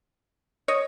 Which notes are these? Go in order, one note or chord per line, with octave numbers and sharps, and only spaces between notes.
C#5 D#5